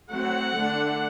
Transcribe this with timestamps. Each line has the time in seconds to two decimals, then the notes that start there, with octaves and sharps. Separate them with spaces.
0.11 F#3 A3 C4 F#5
0.54 D3 A3 D4